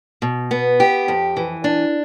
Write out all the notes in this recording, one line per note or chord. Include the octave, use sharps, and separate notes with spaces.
B2
B3
G4
F2
E3
D4